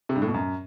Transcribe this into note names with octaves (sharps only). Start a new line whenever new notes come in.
C3
G2
A2
B2
F#2